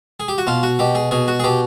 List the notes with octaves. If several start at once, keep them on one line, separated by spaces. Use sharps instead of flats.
G#4
G4
F#4
B2 F4
F#4
B2 G4
G#4
B2 G#4
F#4
G#4
B2 G4